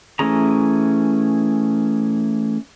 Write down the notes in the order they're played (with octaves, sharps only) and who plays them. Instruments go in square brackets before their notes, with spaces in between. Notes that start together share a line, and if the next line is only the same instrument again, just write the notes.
[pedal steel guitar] E3 A3 C#4 G#4 A#5